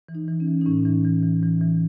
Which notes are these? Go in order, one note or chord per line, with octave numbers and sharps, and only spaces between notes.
E3
D#4
E3
C#4
E3
D#4
A2 C#4
E3
E3
E3
E3
E3